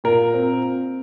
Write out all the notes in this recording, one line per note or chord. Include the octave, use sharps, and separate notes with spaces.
A#2 A#4
C4